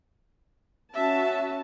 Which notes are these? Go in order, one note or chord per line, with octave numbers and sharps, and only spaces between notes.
C#4 F#4 E5 A5